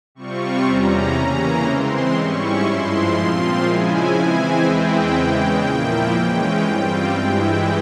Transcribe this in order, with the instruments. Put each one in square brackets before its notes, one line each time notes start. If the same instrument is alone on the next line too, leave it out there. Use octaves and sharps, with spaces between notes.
[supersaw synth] C3 G3 C4 F4 C#6
E2 C3 G3 C#4 A#5
C#3 E3 A#3 C#4 A#5
E3 G#3 C4 C6
G#2 G3 C#4 E4 C#6
G2 F3 G#3 E4 C6
A#2 F3 C4 F4 C6
C#3 F3 G#3 E4 G#5
E3 G#3 C4 E4 G#5
E2 E3 G#3 C4 E4 G5
E2 C#3 E3 G#3
A#2 F3 A#3 E4
E3 G#3 C#4 G5
G2 G3 C4 F4
G2 E3 G#3 E4 G5